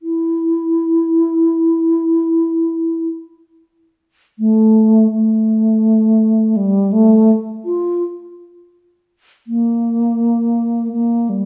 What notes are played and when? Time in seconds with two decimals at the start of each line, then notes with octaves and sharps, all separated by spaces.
0.02 E4
4.39 A3
5.11 A3
6.57 G3
6.93 A3
7.65 F4
9.47 A#3
10.93 A#3
11.29 G3